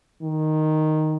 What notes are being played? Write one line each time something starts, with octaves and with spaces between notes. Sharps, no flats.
D#3